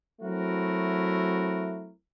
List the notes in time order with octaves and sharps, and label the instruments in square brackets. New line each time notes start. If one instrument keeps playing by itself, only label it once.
[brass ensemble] F#3 A3 C4 E4 F#4 A#4